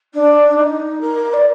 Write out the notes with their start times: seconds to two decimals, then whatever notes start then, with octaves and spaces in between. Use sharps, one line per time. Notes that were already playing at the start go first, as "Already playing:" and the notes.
0.13 D4
0.58 D#4
1.00 A#4
1.33 D5